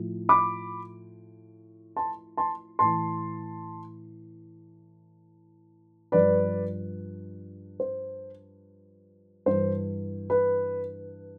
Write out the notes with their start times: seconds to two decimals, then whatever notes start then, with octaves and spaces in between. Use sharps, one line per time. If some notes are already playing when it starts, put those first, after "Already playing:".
Already playing: A2 F3
0.29 B5 D6
1.97 A5 C6
2.37 A5 C6
2.79 A2 E3 A5 C6
6.12 G2 F3 B4 D5
7.80 C5
9.46 G2 E3 C5
10.30 B4